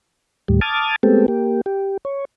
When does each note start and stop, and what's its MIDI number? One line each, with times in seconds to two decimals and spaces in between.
0.48 0.60 39
0.48 0.60 45
0.48 0.60 55
0.61 0.96 81
0.61 0.96 86
0.61 0.96 87
0.61 0.96 89
0.61 0.96 92
0.61 0.96 93
1.03 1.26 56
1.03 1.26 57
1.03 1.26 59
1.03 1.26 60
1.03 1.26 67
1.03 1.26 69
1.28 1.61 58
1.28 1.61 67
1.66 1.97 67
2.05 2.25 73